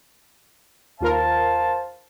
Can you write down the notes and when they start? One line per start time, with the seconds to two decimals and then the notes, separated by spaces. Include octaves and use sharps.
1.01 D#2 F4 A#4 C5 F5 A5